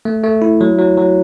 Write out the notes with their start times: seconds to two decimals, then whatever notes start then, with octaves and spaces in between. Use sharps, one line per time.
0.05 A3
0.24 A3
0.42 E4
0.61 F#3
0.78 F#3
0.97 F#3